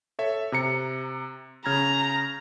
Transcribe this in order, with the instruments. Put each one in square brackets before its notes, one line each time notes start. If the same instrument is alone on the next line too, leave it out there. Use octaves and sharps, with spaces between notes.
[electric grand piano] A4 C#5 E5
C3 A#5 C#7
[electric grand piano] C#3 F6 G#6 [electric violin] A#5